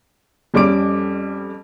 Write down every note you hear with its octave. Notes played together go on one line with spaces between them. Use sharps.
F2 G3 C#4 D6 D7